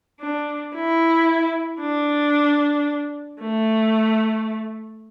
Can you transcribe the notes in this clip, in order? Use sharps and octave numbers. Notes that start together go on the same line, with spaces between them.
D4
E4
D4
A3